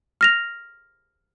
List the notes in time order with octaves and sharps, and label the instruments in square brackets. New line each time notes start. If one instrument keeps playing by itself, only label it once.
[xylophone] F6 A#6 F7